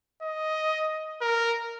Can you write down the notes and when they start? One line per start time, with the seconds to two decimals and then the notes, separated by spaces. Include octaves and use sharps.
0.23 D#5
1.22 A#4